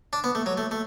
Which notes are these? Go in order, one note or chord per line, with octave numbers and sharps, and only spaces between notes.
D4
B3
A3
F#3
A3
A3